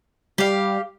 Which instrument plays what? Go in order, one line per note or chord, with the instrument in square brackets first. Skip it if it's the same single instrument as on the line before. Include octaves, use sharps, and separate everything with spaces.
[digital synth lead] G3 [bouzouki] G4 F5